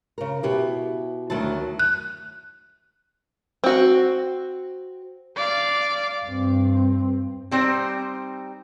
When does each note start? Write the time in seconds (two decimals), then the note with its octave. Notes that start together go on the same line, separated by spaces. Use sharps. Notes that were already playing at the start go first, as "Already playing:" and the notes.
0.18 C#3 A#4
0.43 B2 E4 G4
1.30 D2 D#3 F#3 E4 A5
1.79 F#6
3.64 C4 F#4
5.36 D5 F5
6.26 G2 C4
7.51 G3 C4 D#4 C5